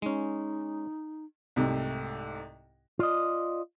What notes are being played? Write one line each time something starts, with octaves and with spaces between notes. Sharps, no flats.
G#3 C#4 D#4
C2 G#2 C3 A3
F4 D5 D#5